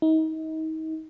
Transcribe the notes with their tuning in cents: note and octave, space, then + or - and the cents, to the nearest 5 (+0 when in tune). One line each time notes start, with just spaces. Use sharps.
D#4 +35